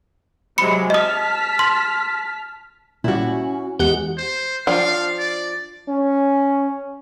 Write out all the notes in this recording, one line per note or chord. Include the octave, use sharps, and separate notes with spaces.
C3 F#3 G#3 B5 C#7
D#5 A5 D#6 F6 B6
C6
A#2 G3 C#4 E4 F#4
E2 G#3 G4 F#5
C5
F3 D4 F5 G5
D5
C#4